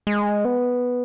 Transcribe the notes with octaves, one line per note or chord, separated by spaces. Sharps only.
G#3
B3